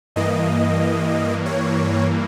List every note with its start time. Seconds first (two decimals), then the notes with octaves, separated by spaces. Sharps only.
0.16 G2 E3 A#3 D#5
1.46 C#5